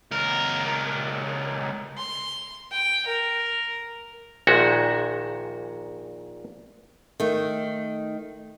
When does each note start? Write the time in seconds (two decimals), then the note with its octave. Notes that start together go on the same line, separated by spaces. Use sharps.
0.11 C#2 A#4
1.98 C6
2.72 G5
3.07 A#4
4.47 A#1 A#2 D#3 G#3 F#4 E5
7.20 D#3 A3